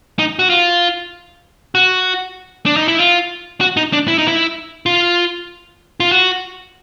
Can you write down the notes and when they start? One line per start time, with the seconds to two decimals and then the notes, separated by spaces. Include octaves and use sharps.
0.19 D#4
0.39 F#4
0.50 F4
1.75 F#4
2.66 D4
2.77 D#4
2.88 E4
2.99 F4
3.61 F#4
3.77 D#4
3.93 D4
4.08 E4
4.18 D#4
4.28 E4
4.86 F4
6.00 F4
6.11 F#4